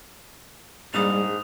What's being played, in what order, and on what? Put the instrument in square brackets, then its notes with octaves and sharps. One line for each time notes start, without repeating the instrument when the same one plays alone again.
[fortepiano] A#1 [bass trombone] G#2 [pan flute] G3 [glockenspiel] D#6 F7